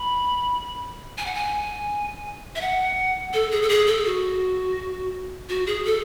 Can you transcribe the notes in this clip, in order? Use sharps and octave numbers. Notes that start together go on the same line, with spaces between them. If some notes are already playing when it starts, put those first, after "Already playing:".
Already playing: B5
G#5
F#5
G#5
E5
F#5
A4
G#4
A4
G#4
A4
F#4
F#4
G#4
A4